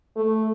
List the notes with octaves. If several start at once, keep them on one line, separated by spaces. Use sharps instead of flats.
A3